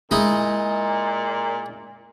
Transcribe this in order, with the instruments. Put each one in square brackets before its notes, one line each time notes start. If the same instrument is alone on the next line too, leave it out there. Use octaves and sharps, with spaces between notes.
[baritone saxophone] A#2 [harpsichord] G#3 D#4 E4